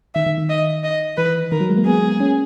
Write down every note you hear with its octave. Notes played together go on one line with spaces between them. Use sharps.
D#3 E5
D#3
D#3
D#5
D#5
E3 B4
D#3 A#4
F#3
G#3
A#3
B3 G#4
C#4